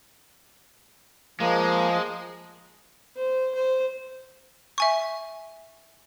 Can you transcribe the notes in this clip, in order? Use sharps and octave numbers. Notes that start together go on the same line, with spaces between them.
F3 G#3 A#3
C5
C5
E5 G#5 C#6